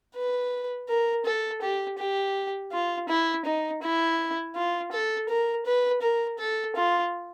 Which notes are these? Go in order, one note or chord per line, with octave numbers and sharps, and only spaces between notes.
B4
A#4
A4
G4
G4
F4
E4
D#4
E4
F4
A4
A#4
B4
A#4
A4
F4